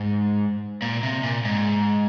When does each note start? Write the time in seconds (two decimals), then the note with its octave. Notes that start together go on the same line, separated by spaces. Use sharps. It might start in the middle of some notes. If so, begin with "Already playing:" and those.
Already playing: G#2
0.82 A#2
1.03 C3
1.23 A#2
1.45 G#2